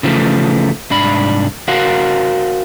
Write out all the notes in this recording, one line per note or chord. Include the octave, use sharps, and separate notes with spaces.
C#3 E3 F3 G3 A3
C2 G#2 D4 B5
F#4 A#4 C5 F5 F#5